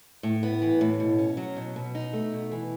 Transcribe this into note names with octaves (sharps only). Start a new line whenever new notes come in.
A2
B3
E3
A2
B2
C#4
F#3
B2
B2
D#4
A3
B2
E3